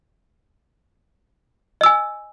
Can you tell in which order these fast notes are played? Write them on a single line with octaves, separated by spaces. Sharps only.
D#5 E6 G#5